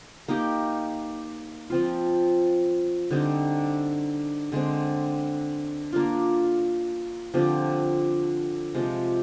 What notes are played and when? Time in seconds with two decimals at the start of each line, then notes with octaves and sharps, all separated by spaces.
0.28 A#3 D#4 G4 A#4
1.70 F3 C4 F4
3.11 D3 G3 C4 D#4
4.52 D3 G#3 C4
5.93 A#3 D4 F4
7.34 D3 F3 C4 G4
8.75 C3 F3 G#3